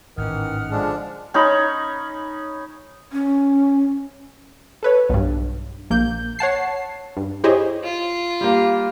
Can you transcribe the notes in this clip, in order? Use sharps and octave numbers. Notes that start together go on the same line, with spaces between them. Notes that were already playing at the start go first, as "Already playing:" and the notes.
G#1 A2 D#3 E3 C#4 F#5 D#6 F6
D3 F3 G#3 D4
C#4 D#4 C#5 B5
C#4
A4 B4 C#5
B1 G2
A#1 A#3 G6
C#5 F#5 A5 C7
G2
E4 G4 G#4 C5 C#5 D#5
F4
G3 A#3